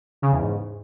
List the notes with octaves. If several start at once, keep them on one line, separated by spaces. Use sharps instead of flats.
C#3
E2
G#2